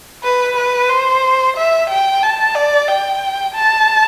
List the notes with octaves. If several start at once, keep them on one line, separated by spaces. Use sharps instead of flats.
B4
B4
C5
E5
G5
A5
D5
G5
A5